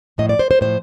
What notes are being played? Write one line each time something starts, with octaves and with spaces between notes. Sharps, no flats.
A2 F3 D#5
D5
C5
C5
A2 F3 C5